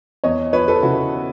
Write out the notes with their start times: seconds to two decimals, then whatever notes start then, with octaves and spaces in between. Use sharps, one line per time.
0.24 E2 C#5 D#5
0.53 F3 B4 C#5
0.68 A4 B4
0.83 C#3 E4 F#4